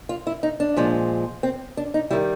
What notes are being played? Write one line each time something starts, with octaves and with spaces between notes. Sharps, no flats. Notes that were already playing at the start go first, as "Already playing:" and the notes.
F4
E4
D#4
D4
A#2 F3 G#3
C4
D4
D#4
D#3 G3 E4